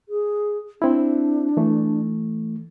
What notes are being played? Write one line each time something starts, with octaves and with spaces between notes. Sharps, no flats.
G#4
C4 D4 E4
E3 A3